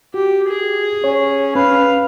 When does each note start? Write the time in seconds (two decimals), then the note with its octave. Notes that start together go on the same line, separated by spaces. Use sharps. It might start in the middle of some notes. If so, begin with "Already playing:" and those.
0.14 F#4 G4
0.49 G#4
1.04 C#4 C#5
1.55 C#4 B4 F5